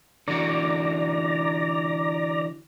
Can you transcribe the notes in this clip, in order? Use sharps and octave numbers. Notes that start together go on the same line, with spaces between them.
D3 E3 F#4 D5 A#5